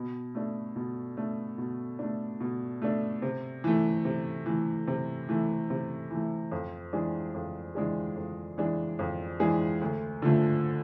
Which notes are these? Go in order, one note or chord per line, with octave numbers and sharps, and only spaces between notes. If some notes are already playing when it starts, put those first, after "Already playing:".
Already playing: B2
A3 D4
B2
A3 D4
B2
A3 D4
B2
A3 D4
C3
E3 A3
C3
E3 A3
C3
E3 A3
C3
E3 A3
F2
E3 G#3 D4 G#4
F2
E3 G#3 D4 G#4
F2
E3 G#3 D4 G#4
F2
E3 G#3 D4 G#4
D2
D3 F3 A3